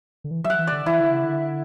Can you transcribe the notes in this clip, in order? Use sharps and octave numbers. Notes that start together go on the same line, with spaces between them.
D3
E3
F#3 E5
F#5
E3
D3 D5
E3 E4
D3
C#3
D3